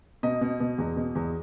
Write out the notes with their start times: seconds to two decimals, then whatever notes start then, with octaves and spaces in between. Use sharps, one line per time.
0.23 B2 D#5
0.41 B2
0.60 B2
0.78 E2
0.97 B2
1.15 E2